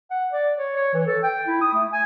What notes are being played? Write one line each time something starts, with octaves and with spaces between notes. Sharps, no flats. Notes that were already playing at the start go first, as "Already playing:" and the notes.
F#5
D5
C#5
C#5
E3
A4
G5
E4
D#6
A3
G#5